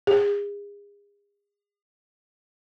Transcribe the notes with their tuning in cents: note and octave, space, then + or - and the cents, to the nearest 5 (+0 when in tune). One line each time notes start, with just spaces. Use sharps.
G#4 -35